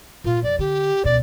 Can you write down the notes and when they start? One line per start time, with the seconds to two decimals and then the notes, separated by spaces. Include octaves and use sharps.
0.24 A#2 F4
0.43 F2 D5
0.59 D3 G4
1.04 C#2 B2 D5